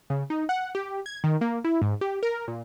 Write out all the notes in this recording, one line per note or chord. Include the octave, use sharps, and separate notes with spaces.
C#3
D#4
F#5
G4
G#6
D#3
A#3
E4
G#2
G4
A#4
A#2